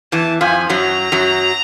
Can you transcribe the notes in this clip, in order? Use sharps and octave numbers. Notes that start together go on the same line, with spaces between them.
E2 E3 A5
F2 F3 G#5
F#2 F#3 A#5
F#2 F#3